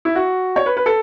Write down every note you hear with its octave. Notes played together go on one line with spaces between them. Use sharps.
E4
F#4
C#5
B4
B4
A4